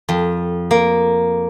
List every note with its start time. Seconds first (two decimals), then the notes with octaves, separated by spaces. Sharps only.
0.09 F2
0.71 A#3